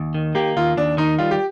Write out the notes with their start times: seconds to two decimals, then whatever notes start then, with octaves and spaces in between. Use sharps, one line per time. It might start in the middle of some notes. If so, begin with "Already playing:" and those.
Already playing: D#2
0.15 D#3
0.35 A#3 G4
0.57 D#2 F4
0.77 D#2 D4
0.97 D#3 D#4
1.18 G3 F4
1.31 G4